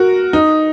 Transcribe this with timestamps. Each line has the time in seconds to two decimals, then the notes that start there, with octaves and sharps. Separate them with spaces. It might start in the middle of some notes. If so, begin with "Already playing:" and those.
Already playing: F#4 A#4
0.33 D#4